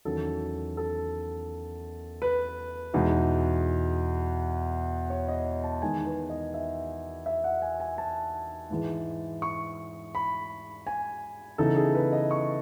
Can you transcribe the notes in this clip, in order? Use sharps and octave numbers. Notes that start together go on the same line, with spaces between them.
E2 D#3 F#3 C#4 A4
A4
B4
E2 B2 G#3 D#4
C#5
D#5
A5
E2 D#3 G#3 B3 D#4 G#5
B4
D#5
E5
E5
F#5
G#5
G#5
A5
G#2 E3 G#3
C#6
B5
G#5
C#3 E3 B3 D#4 A4
G#4
B4
D#5
C#6